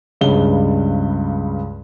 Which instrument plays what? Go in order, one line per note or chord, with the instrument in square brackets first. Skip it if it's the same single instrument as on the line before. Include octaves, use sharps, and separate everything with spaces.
[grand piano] C#2 G2 C#3 G7